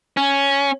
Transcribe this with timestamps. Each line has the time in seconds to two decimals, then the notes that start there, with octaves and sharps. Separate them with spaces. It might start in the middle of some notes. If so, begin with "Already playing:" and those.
0.17 C#4